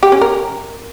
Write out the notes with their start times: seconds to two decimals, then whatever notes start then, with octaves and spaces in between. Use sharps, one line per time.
0.03 G4
0.12 C#4
0.21 A#4